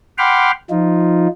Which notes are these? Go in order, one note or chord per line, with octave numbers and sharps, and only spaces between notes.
F#5 G5 B5 C6 D6 F6
F3 D#4 F4